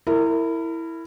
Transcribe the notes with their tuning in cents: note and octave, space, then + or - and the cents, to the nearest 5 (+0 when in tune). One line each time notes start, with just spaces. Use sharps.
E4 +0 A#4 -30